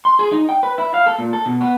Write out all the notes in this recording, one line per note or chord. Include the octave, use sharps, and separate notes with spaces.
C6
G#4
D#4
G5
B4
E4
F5
A4
A#2
A4
B2
B3